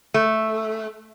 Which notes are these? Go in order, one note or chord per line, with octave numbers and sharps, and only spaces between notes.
A3